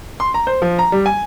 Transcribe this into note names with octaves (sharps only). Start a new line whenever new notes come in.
C6
A#5
C5
F3
A#5
G3
G#5